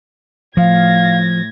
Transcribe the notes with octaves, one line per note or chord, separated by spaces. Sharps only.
A2 F3 F5 G#6 A#6